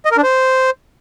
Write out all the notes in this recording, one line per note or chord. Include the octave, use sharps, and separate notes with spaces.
D#5
A#4
D4
C5